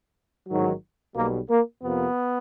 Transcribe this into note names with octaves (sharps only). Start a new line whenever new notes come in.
A1 G#2 D#3 F#3
B1 B2 G3 A#3
A#3
F2 C3 F3 A#3 B3